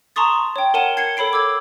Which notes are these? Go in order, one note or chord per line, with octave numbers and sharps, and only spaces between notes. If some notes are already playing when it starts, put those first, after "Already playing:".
A5 A#5 C6 C#6 D#6 A6
C#5 G5
A#4 C#5 F#5 A5 D#7 G7
G#6 C7 C#7 G7
A4 C#5 B5 C7 D7
D6 E6 G#6